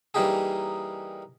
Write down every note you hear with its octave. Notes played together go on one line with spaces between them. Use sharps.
E3 G3 A#3 D#4 G4 G#4